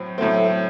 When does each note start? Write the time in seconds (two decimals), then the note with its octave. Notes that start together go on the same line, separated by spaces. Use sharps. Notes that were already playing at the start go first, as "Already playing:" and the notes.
Already playing: A2 F#3 C4
0.18 A2 F#3 A3 C4